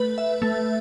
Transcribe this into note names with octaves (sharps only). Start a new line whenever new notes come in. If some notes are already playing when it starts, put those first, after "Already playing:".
Already playing: A3 B4
E5
A3